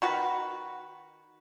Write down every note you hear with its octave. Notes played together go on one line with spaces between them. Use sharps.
D#3 F#4 B4